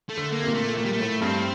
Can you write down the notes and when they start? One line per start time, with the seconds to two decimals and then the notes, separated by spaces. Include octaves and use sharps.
0.10 A3
0.17 D3
0.33 A#3
0.42 C3
0.47 A#2
0.55 A3
0.77 A#2 A3
0.85 G3
0.93 A3
1.00 A2
1.22 G2 C4